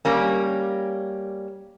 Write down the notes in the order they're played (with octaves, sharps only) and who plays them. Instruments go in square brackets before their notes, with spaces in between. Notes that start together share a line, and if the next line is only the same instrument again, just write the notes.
[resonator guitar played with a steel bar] G3 A#3 C#4